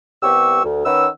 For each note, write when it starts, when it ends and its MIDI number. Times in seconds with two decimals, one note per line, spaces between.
0.23 0.63 36
0.23 0.63 59
0.23 0.63 67
0.23 0.63 85
0.23 0.63 88
0.64 0.83 38
0.85 1.07 51
0.85 1.07 61
0.85 1.07 71
0.85 1.07 75
0.85 1.07 78
0.85 1.07 88